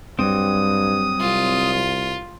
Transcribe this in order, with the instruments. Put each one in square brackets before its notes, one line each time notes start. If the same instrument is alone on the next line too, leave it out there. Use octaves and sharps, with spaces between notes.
[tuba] G2 [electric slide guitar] F#3 G3 C4 [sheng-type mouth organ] D#6
[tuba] C2 [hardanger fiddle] F4